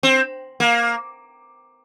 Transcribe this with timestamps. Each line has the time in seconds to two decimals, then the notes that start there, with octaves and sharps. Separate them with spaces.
0.03 C4
0.60 A#3